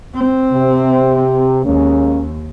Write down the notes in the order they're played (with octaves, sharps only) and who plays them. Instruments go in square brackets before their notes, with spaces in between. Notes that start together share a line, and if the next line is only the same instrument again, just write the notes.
[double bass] C4
[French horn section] C3
[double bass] D#2 [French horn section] G#3 A#3 C#4